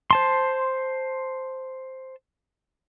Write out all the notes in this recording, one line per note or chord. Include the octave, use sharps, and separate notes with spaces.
C5 A5 C6